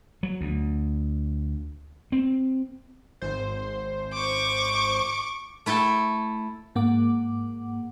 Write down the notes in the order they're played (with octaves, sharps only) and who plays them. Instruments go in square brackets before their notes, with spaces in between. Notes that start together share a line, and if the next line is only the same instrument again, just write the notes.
[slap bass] F#3
D2
C4
[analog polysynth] G#1 C5
[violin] C#6 D6
[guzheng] A3 E4 A4 G5
[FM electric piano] G#2 A#3 F#5 D6